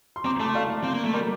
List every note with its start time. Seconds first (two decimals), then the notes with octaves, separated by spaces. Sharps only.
0.16 C6
0.25 C4 A#5 D6
0.40 A3 A5 C6
0.55 D5 F5
0.84 C4
0.94 A#3
1.04 A3
1.14 G3 A#4 D5